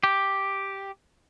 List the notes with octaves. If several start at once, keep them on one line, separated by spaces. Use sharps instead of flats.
G4